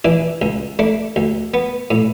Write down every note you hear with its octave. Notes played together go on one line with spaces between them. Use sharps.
E3 D4
C#2
A3 D4
D2
B3
A2